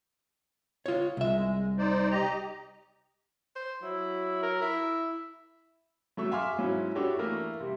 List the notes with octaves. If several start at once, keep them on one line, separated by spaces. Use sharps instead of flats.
F4 C#5
C2 G#3 E5
D#4 C5 D5
G4 D#5 A#5
C5
F#3 E4
A#4
E4 E5
F#3 A3 C#6 E6
E5 F5 G#5 C6 D6 F6
G#2 F#3 C#4 E4
D4 E4 F#4 G4 A4 C#5
E3 A3 A#3 A#4
C3 G3